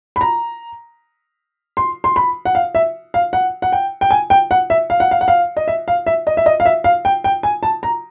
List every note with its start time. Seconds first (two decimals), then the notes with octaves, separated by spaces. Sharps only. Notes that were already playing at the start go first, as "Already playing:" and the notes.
0.16 B5
0.21 A#5
1.77 C6
2.04 C6
2.16 B5
2.45 F#5
2.55 F5
2.75 E5
3.14 F5
3.33 F#5
3.62 F#5
3.72 G5
4.01 G5
4.11 G#5
4.30 G5
4.51 F#5
4.70 E5
4.90 F5
5.00 F#5
5.11 F5
5.21 F#5
5.28 F5
5.57 D#5
5.68 E5
5.88 F5
6.07 E5
6.27 D#5
6.37 E5
6.46 D#5
6.60 F5
6.65 E5
6.84 F5
7.05 G5
7.24 G5
7.43 G#5
7.63 A5
7.83 A#5